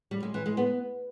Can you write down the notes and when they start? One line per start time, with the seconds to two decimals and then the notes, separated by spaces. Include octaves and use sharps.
0.11 G3
0.23 G#3
0.34 E3
0.46 G#3
0.57 B3